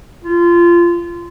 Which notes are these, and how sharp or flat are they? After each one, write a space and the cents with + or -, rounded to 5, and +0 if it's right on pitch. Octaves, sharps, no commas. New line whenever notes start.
F4 -20